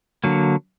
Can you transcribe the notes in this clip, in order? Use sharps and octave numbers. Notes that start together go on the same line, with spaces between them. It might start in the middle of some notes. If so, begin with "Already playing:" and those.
D3 F#3 A#3